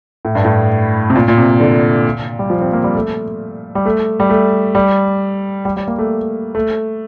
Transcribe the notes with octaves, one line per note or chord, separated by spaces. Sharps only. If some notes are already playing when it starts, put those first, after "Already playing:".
A2
G2
A2
C3
A#2
A#2
C3
D3
G3
F3
C4
A#3
G3
A3
G3
A3
G3
A3
G3
G3
G3
A#3
A3
A3